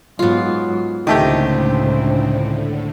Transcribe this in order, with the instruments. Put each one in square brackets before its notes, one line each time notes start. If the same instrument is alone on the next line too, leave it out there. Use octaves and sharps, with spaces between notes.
[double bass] G#2 F#3 [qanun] B3 F4
[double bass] C#2 C4 [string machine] A2 D3 [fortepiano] D#3 A3 G4 [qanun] D#5